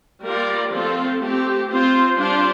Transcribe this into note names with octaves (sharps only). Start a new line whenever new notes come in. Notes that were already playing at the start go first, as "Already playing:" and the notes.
G3 A#3 F4 A#4 D5
F3 A3 C4 F4 A4
A3 C4 G4
C4 F4 C5
G3 D4 F4 C5